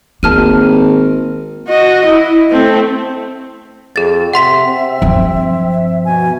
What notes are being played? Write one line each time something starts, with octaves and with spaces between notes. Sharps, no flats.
G#1 A#3 A5 F6 D#7
F#4 D#5
E4
A3 C4
F2 G#4 A6
C3 E5 F#5 C6 B6
C4
G2 F3 C4
B2 G#5